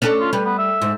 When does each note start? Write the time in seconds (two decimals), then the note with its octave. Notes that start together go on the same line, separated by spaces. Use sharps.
0.02 C#4 D4 A4
0.20 F4
0.33 G3 B4
0.46 B3
0.58 E5
0.82 G#2